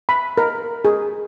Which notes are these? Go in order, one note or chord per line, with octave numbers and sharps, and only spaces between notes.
B5
A#4
G#4